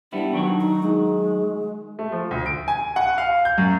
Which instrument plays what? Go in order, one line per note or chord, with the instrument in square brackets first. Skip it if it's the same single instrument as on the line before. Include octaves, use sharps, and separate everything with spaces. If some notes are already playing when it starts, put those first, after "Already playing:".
[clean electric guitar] G3 B3 E4 [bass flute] D4
[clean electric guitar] D#3 F#3 F#4
[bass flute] D#4
G#3
[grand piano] A3
F3
D2
D7
G#5
F#5
F5
G6
F#2